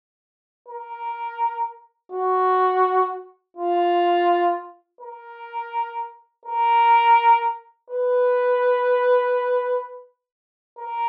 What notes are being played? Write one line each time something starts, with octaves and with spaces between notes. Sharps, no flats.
A#4
F#4
F4
A#4
A#4
B4
A#4